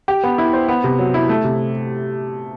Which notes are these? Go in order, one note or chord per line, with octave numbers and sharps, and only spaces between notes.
G4
B3
E4
C5
B3
C3
F#3
E4
A3
C3